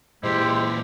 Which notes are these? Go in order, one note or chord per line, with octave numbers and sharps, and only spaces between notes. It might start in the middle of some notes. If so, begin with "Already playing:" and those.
A#2 E3 G#3 E4 G4 C5